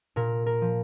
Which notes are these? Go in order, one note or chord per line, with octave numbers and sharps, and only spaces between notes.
A#2 A#4
A#4
F3